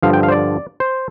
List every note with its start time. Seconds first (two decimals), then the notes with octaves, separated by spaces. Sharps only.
0.03 G2 D3 F3 F5
0.13 G5
0.23 F5
0.28 C5
0.32 D5
0.80 C5